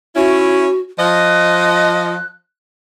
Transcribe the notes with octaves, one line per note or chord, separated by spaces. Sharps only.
C#4 E4 F#4
F3 D#5 F#6